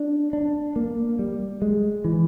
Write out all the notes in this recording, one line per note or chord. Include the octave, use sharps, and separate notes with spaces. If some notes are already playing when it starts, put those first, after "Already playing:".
Already playing: D4
D4
A#3
G3
G#3
E3